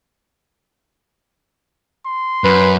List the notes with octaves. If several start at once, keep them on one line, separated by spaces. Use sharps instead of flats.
C6
F#2 B4